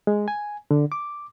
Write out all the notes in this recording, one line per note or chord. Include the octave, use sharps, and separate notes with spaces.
G#3
G#5
D3
D6